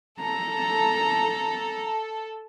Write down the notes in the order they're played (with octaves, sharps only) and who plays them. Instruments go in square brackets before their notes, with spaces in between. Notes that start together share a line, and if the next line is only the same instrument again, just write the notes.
[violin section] A4 [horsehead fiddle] A#5